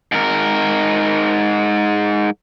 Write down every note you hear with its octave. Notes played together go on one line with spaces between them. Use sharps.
G#2 A#4